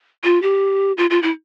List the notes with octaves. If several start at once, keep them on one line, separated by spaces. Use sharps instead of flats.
F4
G4
F4
F4
E4